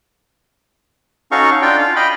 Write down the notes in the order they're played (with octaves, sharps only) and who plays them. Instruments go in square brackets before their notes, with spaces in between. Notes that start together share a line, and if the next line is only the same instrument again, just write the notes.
[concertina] C#4 D#4 F#4 A4 F5 C#6
D4 F4 G5
F5
D#5 G5 B5